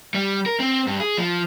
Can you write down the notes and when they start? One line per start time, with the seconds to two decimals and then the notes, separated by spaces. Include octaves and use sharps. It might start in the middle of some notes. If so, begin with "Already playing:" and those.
0.14 G3
0.46 A#4
0.60 C4
0.87 G2
1.00 G#4
1.17 F3